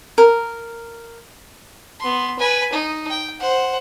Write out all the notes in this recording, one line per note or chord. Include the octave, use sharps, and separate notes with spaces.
A#4
B3 C6
B4 G#5
D#4
G5
C5 F#5